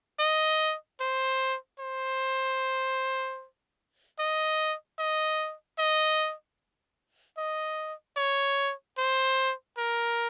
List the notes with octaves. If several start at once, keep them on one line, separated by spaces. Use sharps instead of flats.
D#5
C5
C5
D#5
D#5
D#5
D#5
C#5
C5
A#4